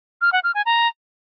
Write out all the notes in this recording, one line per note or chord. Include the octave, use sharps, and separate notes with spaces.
F6
F#5
F6
G#5
A#5